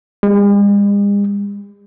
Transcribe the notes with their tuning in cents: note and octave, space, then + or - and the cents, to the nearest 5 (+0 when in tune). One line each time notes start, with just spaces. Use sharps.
G#3 -45